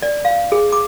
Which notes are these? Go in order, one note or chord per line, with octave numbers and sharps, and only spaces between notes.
D5
F5
G#4
D6